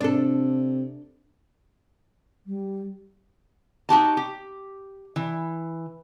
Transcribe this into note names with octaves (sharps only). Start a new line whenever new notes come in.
C3 D4 A4
G3
D#4 F#4 G4 A5
G4
E3